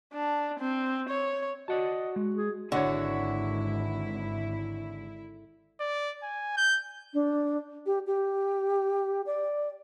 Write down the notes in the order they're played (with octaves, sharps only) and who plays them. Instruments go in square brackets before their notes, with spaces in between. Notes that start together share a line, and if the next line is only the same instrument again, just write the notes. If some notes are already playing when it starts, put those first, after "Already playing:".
[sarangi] D4
C4
C#5
[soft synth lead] F#4 [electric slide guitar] D5 F#5 A5 [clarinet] D#5
[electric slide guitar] G#3
[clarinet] G#4
[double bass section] G#1 [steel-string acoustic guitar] D3 [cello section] E4 [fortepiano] F#4 C#5
[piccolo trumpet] D5
G#5
G6
[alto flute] D4
G4
G4
D5